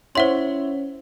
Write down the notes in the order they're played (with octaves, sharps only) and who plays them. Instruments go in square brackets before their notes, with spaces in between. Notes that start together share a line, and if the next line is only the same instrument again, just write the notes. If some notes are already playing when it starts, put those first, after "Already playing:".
[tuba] C#4 [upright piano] E4 C#5 [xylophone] C5 F#5 C6